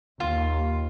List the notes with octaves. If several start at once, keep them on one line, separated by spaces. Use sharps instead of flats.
D#2 F4